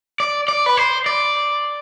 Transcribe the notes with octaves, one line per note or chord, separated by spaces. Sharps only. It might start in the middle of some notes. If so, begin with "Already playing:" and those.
D5
D5
B4
C5
D5